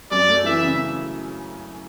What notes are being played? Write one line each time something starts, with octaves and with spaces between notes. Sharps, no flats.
F#2 D5
A3
E3 E5
C#3